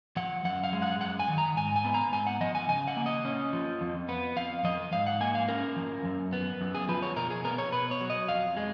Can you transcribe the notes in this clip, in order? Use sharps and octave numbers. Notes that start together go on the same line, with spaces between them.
F3 F#5
F#2 F#5
F5
G#3
F#5
F#2 F#5
G#5
D#3
A#5
G#2 G#5
G#5
B3
A#5
G#2 G#5
F#5
F3 D#5
G#5
C#3 G#5
F#5
A#3
D#5
C#4
F3
F2
B3
F2 F5
F3 D#5
G#2 F5
F#5
A#3 G#5
F5
C#4 A#4
F3
F#2
B3
F#2
G#4
F3 B4
C#5
B2 A#4
G#4
B3 A#4
C#5
B2 B4
C#5
F#3
D#5
F2 F5
G#3